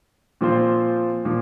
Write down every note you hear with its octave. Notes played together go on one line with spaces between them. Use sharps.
A#2 F3 C4 F4 C5
A#2 F3